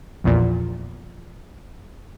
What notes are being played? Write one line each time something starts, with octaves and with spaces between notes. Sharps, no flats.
A#1 E2 A#2